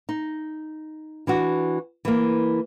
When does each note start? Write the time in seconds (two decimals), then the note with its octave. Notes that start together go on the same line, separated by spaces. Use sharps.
0.09 D#4
1.27 E3 D4 F#4
2.05 E3 A#3